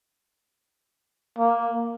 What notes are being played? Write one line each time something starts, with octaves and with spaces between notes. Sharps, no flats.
A#3